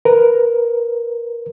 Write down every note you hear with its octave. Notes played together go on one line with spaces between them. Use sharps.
A#4 B4